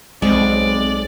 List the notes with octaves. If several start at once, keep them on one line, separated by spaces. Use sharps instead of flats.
B1 G#3 C4 D5